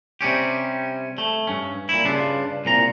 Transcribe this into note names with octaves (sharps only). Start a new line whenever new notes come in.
C3 G3 C#4 G4
A3
G2 C#4
A#2 E4
G2 C#3 D4 F4
C2 A#2 A#5